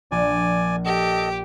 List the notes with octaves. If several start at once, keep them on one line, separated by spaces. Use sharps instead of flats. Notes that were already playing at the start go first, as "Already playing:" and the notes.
A#1 D5 G#5
G4 A4 D#5